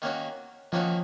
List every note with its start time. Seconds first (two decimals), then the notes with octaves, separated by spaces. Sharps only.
0.02 D#3 A#3 C#4 F#4
0.72 D#3 F3 A#3 C#4 F#4